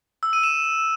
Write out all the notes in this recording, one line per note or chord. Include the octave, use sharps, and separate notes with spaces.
E6
D#7
E7